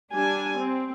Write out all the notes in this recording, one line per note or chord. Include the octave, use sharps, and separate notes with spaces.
G3 D4 G#5
C4